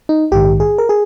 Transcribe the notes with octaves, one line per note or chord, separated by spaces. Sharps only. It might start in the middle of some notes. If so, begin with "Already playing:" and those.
D#4
A#1 G#2 D#3 G4
G#4
A#4
G#4